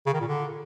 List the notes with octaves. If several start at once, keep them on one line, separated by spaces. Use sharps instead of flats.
C#3
D#3
A#2
D3